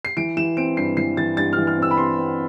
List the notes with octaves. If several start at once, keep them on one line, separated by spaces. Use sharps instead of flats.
C7
E3 D7
E3 E7
C4 D7
G2 C7
E3 C7
E3 A6
G2 A6
E3 F6
F6
C4 E6
B5
C4 C6
C4